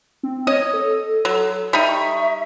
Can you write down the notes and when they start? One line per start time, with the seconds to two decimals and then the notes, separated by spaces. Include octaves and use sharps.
0.23 C4
0.47 C#5 D#5
0.74 A4
1.25 F#3
1.73 G3 D#4 E5
1.88 C#6